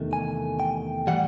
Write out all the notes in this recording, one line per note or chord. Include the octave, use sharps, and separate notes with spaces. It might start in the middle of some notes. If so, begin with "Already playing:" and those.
Already playing: E2 C3 D#3 A3
G#5
G5
A2 E3 G3 F#5